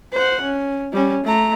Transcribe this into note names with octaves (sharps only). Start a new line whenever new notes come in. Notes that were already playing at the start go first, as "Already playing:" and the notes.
C5 F#5
C#4
G3 C#4
A3 A#5